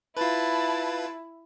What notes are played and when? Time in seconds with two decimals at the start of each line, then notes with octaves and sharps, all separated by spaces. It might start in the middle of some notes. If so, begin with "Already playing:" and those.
0.17 E4 F4 B4 A5